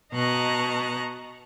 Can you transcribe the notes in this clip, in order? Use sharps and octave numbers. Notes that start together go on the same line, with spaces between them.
B2 D#5 A5 A#5 C#6 F#6